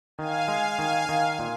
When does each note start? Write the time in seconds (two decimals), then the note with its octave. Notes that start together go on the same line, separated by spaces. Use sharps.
0.18 D#3 F5 G#5
0.48 G#3
0.78 D#3 F5 G#5
1.09 D#3
1.39 A#2